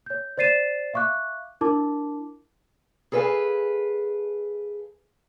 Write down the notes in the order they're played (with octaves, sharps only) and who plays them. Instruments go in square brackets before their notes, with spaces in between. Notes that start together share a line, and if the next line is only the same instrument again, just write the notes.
[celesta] C#5 G6
C5 D5 A6 C7 D#7 E7
E5 F5 C#6 D6 F#6
D4 E4 A#4 A5 D6
[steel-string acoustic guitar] G#4 A4 B4 D#5 F5 G#5